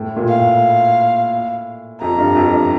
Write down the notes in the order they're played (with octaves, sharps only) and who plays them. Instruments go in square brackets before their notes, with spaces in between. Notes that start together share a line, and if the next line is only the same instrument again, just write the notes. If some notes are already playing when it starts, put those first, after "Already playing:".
Already playing: [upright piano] A2
A#2
[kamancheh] F5
[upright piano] A2
[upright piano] F2 [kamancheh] A#5
[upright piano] G2
F2
G2